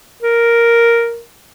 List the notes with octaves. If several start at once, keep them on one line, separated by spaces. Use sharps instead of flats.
A#4